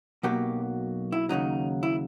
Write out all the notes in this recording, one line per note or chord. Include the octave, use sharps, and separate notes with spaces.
B1 B2 F#3 A#3 G4
E4
D#2 C#3 F#3 D#4
E4